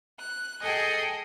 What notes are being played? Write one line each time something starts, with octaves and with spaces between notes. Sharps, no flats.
F#6
G#4 A4 D#5 G5 G#5